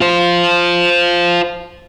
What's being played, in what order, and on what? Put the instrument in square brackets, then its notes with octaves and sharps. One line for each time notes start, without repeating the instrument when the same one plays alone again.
[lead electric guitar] F4 C5